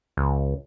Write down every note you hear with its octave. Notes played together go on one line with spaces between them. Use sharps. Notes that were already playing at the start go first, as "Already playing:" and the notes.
C#2